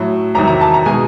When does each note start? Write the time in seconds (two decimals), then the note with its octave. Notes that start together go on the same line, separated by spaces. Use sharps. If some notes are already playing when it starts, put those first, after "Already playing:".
Already playing: A2 F#3
0.35 E2 C3 D#3 F#3 A#5
0.47 A#5
0.61 A5
0.74 A#5
0.86 B2 G#3 G#5